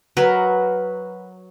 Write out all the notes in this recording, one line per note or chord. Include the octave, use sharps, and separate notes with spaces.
F#3 A#4 B4